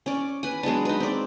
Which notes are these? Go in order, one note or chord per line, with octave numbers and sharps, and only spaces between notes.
C#4 D5
B4 G#5
F#3 G#3 B3 D4
D#4 B4
C4 D5